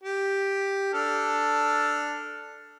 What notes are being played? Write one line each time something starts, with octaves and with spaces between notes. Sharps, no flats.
G4
D4 A4 F6